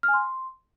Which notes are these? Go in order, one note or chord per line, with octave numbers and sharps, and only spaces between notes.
F6
G#5
C6